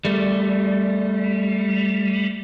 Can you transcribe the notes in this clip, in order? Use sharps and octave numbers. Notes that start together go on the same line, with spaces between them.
G3 A3